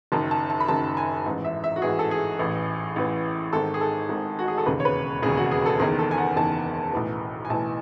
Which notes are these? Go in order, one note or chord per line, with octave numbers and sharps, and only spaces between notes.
F#1 F#2 D#3 A5
A5
A5
B5
F#1 F#2 D#3 A5
G#5
A1 G#2 E3
E5
E5
F#4
A1 G#2 E3 G#4
A4
G#4
A1 A2 E3
A1 A2 E3
G#1 G#2 D#3 A4
G#4
A4
G#1 G#2 D#3
F#4
G#4
A4
E1 D#2 C#3 B4
C#5
B4
E1 D#2 C#3 G#4
F#4
G#4
A4
F#1 E2 D#3 G#4
A4
G#5
F#5
F#1 E2 D#3 A5
B1 A2 E3
G#5
B1 A2 E3 A5